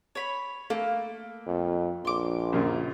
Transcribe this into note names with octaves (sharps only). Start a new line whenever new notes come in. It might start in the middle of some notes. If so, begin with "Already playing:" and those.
C#5 B5
A3 A#3
F2
A#1 C6 D6
F#2 A#2 C#3